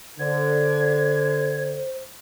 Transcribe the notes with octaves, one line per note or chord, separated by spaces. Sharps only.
D3 C5 G#6